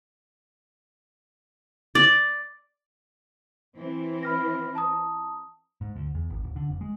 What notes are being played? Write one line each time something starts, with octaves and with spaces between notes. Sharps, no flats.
D5
E3 C4
B5 F6 A#6
A5 A#5 D#6
G#2
D2
E2
G#1
D1
D3
F1
G#3